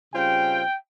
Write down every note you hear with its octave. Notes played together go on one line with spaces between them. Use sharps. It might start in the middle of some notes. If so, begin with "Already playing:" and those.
C#3 G3 C4 F4 G5